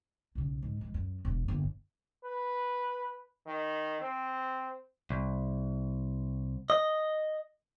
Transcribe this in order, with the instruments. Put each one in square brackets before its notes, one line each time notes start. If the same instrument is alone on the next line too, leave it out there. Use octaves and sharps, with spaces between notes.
[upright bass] B1 C#3
G#2
E3 G#3
F#2
E1 E2
G1 A#3
[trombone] B4
D#3
C4
[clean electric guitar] C2
D#5